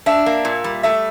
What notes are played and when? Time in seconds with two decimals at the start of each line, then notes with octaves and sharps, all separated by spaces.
0.06 D4 E5
0.26 A#3
0.45 A#2
0.64 G3
0.83 A3 E5